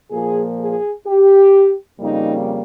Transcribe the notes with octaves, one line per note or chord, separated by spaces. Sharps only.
A#2 F3 A#3 G#4
G#4
G4
F2 C#3 G3 A#3 D#4